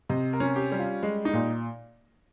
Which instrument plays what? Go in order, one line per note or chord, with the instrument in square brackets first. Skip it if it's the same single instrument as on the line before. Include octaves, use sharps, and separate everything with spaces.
[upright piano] C3 [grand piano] D#5
[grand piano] A#4
[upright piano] C#4
[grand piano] G4
[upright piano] G3
[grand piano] F4
[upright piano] G#3
[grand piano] D#4
[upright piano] A#2